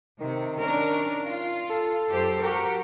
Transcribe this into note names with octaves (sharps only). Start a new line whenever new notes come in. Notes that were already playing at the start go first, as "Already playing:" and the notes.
C3 D#3
C#4 D4 A#4
F4
A4
F#2 G4 C5
F#4 G4 A#4